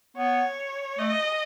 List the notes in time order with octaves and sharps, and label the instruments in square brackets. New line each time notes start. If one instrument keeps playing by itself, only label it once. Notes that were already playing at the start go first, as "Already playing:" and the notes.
[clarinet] B3 [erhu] C#5
[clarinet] A3 [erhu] D#5